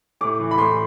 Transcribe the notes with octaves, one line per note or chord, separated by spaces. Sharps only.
A2 D6
E3
B5
A2 C6